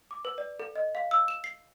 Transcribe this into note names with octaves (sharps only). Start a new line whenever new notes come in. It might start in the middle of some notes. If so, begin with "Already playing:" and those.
D6
B4
D5
A4
D#5
F5
E6
E7
C7